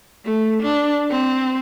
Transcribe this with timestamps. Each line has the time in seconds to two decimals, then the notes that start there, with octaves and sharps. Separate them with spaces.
0.25 A3
0.62 D4
1.10 C4